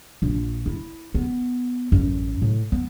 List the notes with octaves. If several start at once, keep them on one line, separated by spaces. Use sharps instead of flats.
A#1 F4
E4
B3
A1 F#2
A2
B3